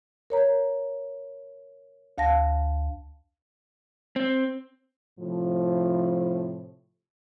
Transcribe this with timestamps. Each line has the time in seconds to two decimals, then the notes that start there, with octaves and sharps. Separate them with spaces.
0.30 A#4 C#5 A#5
2.18 D2 F5 A5 A#6
4.16 C4
5.20 A2 C3 F3